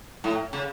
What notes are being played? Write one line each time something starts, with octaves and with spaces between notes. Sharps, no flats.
A2
C#3